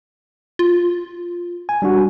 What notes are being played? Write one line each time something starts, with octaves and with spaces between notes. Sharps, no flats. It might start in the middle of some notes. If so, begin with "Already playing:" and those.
F4
G#5
G3 D4 F#4